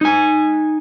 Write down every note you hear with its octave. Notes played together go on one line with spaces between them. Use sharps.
D#4 G#5